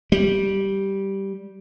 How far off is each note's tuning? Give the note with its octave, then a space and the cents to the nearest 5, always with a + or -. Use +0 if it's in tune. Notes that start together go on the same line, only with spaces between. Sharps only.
G3 -5